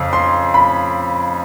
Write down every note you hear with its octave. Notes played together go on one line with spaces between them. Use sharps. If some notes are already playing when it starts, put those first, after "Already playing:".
Already playing: F2 C#3
C6
B5